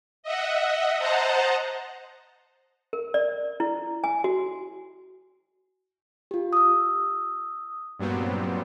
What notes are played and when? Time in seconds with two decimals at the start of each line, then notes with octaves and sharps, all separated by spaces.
0.23 D#5 E5 F#5
0.99 C5 D#5 F#5 A5 A#5
2.93 A#4
3.14 D5
3.60 E4
4.04 G#5
4.24 F#4
6.31 F4 G4
6.53 D#6 E6
7.99 G2 A#2 F#3 G3 B3 C4